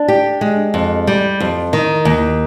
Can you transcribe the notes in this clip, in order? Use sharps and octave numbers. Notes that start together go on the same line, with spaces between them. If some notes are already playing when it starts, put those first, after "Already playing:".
Already playing: D4
G4
G#3
F2
G3
F2
D#3
D#2